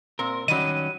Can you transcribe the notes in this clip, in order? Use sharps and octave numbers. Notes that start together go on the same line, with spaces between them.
A#2 C4 A#4
D#3 F#3 G3 C#4 D#5 D#7